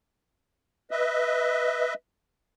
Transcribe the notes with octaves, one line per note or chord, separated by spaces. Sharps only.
B4 D#5 E5